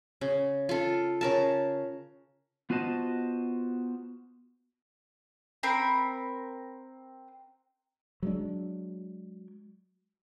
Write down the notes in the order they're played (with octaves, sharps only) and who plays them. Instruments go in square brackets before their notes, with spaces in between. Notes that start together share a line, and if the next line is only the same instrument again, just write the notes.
[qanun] C#3
F4 A4
C#3 A#4 A5
[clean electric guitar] B3 F4 F#4 C5 D#5 A5
[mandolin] C4 A#4 B5
[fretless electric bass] F#3 G#3 D4